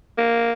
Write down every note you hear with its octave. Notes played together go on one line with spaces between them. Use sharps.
A#3